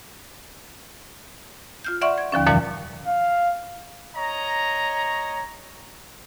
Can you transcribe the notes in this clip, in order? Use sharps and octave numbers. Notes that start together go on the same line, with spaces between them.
F4 F6 G6
D5 E5 F#5 C6 C#6
G#6
D#2 D3 F3 C#4
F2 A#2 D3 E3 F3 G3
F5
C#5 D#5 A#5